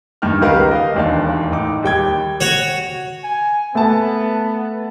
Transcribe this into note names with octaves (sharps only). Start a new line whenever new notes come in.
F#1 G2 D#3 F6
C#2 D#3 G4 A#4 B4 F5
D#5 F5
E1 D#2 D4 F5
A2 D#4 D6
D#2 G3 G5 G#6
F#4 C#5
G#5
A3 B3 A5